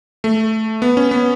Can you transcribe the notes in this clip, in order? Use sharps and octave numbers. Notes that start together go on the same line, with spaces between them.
A3
B3
C#4
B3